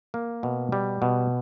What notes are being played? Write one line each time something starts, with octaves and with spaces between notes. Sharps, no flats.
A#3
B2
G3
B2